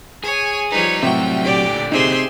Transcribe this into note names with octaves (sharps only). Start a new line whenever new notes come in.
G#4 C#5 G#5
F3 G3 D#4 B4 C#5
A2 C3 F#3 G3 F#4 E5 G5
A#2 D3 G4 D5
C3 D#4 G4 G#4 C5 E5 C6